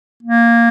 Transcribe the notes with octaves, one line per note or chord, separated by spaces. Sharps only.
A#3